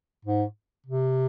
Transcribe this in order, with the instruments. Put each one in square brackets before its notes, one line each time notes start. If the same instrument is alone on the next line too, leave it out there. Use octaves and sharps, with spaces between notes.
[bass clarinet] G#2
C3